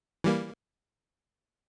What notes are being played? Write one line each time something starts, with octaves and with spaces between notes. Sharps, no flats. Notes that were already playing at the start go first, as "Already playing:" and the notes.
E3 G3 A#3